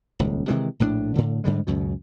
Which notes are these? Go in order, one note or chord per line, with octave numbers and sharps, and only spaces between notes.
D#1 C#2
C3 D#3 E3 G#3
A#1 A2 E3 D4
A2 D3
G#2 D3 G3 G#3
C#2 F#2 B2